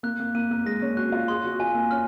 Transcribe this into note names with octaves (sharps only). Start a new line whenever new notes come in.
A#3 F#6
A#3
A#3 D#7
A#3
G#3 A#6
C#4
F#4 F#6
F4
G#4 C6
F#4
F4 G#5
A#3
C#4 F6